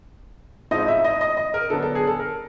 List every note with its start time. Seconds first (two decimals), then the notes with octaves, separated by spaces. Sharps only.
0.71 A2 F3 G#3 C4 D#4 D#5
0.88 E5
1.04 D#5
1.21 D#5
1.37 D#5
1.54 A#4
1.70 D3 F#3 B3 D4 A4
1.82 A4
1.95 G#4
2.07 A4
2.19 A#4